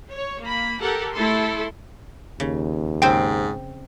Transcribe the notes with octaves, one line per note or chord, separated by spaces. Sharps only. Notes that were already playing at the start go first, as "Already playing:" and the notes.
C#5
A#3 B5
G4 A4 A#4 F#5
A3 E4 A4 C6
D#2 C#3
G#2 C#3 C4 C5 G5